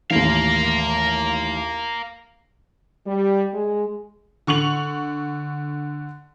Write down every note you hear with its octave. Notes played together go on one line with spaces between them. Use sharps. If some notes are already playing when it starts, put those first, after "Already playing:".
A1 D#2 A#4 F5
G3
G#3
D3 C#6 F7 F#7